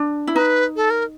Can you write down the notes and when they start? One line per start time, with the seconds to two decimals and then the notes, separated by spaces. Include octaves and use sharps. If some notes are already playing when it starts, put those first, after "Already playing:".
Already playing: D4
0.27 E4
0.35 D#4 B4
0.76 A4
0.90 A#4